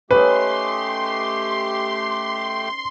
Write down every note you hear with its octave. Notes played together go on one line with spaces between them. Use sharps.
A3 C#4 D#4 G4 B4 C6